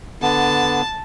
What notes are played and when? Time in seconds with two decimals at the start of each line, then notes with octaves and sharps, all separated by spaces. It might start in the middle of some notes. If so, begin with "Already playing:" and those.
0.22 D3 B3 A5